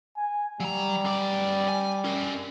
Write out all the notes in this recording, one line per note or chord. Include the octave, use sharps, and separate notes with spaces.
G#5
F#3 G3 A#5
F#2 D5
G#5
C#4 A#4